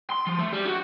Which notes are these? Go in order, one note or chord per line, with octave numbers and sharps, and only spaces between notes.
C6
F3
A3
G3
F#4